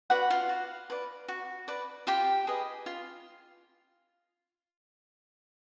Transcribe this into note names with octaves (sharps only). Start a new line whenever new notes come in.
F#4 B4 D5 F#5
F4 F5
F#4
B4 D5
F#4
B4 D5
F4 G4 G5
G#4 B4 D#5
F4